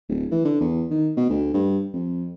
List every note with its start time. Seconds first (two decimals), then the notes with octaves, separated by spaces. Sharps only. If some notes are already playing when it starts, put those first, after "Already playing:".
0.09 D1
0.32 E3
0.45 D3
0.61 E2
0.91 D#3
1.17 B2
1.29 D2
1.54 G2
1.93 F2